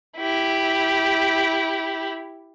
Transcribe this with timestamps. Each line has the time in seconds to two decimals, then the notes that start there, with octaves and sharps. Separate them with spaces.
0.17 E4 G4